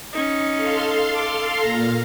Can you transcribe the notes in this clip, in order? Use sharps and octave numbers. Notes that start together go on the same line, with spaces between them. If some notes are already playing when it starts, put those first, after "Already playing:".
C#4 D#4
A4 F5 C6
D6
A#2 F5 A#5